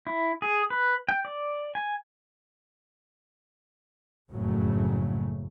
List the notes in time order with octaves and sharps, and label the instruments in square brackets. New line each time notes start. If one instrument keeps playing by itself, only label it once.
[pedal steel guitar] E4
G#4
B4
G5
D5
G#5
[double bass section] F#1 F2 A2 C#3 F#3 A3